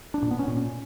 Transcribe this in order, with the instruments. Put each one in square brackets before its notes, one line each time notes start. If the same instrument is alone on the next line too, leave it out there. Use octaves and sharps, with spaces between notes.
[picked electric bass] D4
A#2
B3
C#4
A#2